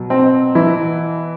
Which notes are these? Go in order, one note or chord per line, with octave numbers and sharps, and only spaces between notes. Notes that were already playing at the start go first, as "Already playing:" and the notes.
Already playing: B2 F#3
C4
E3 E4